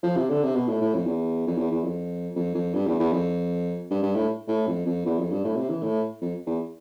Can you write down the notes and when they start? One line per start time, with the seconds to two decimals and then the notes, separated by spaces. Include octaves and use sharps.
0.03 F3
0.16 C3
0.30 D3
0.43 C3
0.55 B2
0.69 A2
0.81 A2
0.94 F2
1.07 E2
1.47 F2
1.58 E2
1.71 E2
1.84 F2
2.36 F2
2.55 F2
2.74 G2
2.87 E2
3.00 E2
3.13 F2
3.90 G2
4.03 G2
4.15 A2
4.48 A2
4.67 F2
4.86 F2
5.06 E2
5.19 F2
5.31 G2
5.44 A2
5.57 C3
5.70 E3
5.83 A2
6.21 F2
6.47 E2